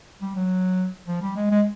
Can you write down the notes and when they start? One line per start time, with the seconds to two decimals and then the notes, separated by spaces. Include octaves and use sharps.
0.21 G3
0.35 F#3
1.07 F3
1.22 G3
1.36 G#3
1.51 G#3